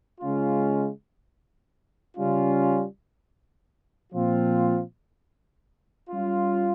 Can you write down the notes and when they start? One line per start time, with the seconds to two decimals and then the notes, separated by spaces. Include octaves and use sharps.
0.21 C#3 G#3 C#4 F4
2.17 C#3 G3 C#4 F4
4.13 A#2 F3 C4 F4
6.09 G3 C#4 F4